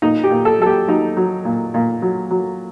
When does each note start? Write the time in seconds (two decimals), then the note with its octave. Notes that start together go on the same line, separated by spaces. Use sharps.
0.02 A#2 D#4
0.24 G4
0.31 A#2
0.45 A4
0.60 F#3 A4
0.66 G4
0.88 F#3 D#4
1.17 F#3
1.45 A#2
1.74 A#2
2.02 F#3
2.31 F#3